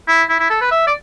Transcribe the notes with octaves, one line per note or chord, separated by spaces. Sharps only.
E4
E4
E4
A4
B4
E5
D5